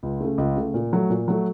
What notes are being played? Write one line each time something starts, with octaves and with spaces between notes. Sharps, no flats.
C#2
C#3 A3
C#2
C#3 A3
A#2
F#3 A3
A#2
F#3 A3